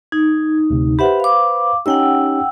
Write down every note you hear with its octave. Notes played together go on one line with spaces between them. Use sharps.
D#4 G#6
D2 C3
G4 B4 C5 E5 F#5 B5
F5 D6
C#4 D#4 G4 F#5 G5 E6